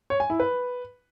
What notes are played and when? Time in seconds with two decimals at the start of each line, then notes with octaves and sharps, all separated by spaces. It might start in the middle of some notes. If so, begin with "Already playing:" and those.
0.10 C#5
0.20 G#5
0.30 E4
0.40 B4